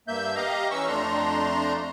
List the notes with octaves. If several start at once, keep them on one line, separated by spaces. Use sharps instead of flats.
G2 A#3 E5 G6
G4 D#5 F5 A#5
E3 C#4 C#6 E6
F2 A3 D4 A#5 C6